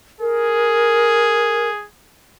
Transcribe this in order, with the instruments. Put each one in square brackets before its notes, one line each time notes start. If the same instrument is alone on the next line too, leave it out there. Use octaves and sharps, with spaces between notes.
[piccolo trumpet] G#4 [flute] A#4